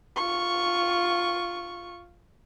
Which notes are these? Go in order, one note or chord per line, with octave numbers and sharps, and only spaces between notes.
F4 C#6